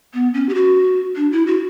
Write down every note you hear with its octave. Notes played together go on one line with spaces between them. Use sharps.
B3
C#4
G4
F#4
D4
E4
F#4